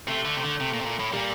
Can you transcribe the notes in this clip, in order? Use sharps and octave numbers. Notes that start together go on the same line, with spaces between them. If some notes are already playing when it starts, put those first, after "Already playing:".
C3 A3
D3
C3
D3
C3
A#2
C3
A#2
A2
A#2 G3